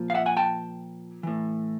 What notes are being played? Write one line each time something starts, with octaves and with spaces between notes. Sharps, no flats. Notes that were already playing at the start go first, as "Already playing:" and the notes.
Already playing: A#2 F3
F5
E5 F#5
F#5 G#5
G5 A5
A2 E3